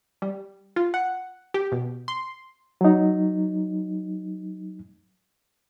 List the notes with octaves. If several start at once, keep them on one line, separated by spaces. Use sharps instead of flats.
G3
F4
F#5
G4
B2
C6
F#3 D#4